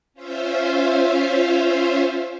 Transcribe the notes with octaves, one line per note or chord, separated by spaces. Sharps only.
C#4 F4 C5 E5 F5